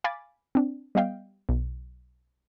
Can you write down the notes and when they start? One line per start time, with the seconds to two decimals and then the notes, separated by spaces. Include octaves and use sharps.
0.04 F5 G#5 B5 D6 A6
0.55 C4 D4
0.95 G3 B3 D#5 F5 G5
1.49 B1